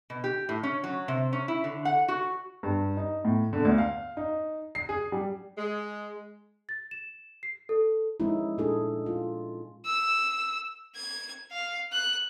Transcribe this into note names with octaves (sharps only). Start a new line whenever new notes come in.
B2
G4
A2
C#4
F#3
C3
C#4
E4
D3
F#5
F#4
G2
D#4
A2
D3
D2
F5
D#4
C7
G#4
G3
G#3
A6
E7
C7
A4
F3 G#3 C#4 D#4 E4
A#2 D4 G#4 A4
F4
E6
G#6
F5
F#6